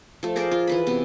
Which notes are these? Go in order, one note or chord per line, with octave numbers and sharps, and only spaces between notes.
F3 A3
G#4 A#4 C5 D5
F4
E3 B4 B5
C3 B3